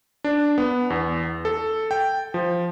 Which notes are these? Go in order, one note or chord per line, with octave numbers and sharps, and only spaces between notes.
D4
B3
E2
A4
G5
F3